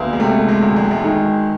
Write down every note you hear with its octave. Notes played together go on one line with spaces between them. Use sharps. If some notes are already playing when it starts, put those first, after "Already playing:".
Already playing: D2 A#3 B3
G#3
C3 A3
G#3
D2
G#3
A3
G#3
D#3